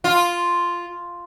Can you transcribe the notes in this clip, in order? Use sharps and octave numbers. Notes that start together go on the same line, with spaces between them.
F4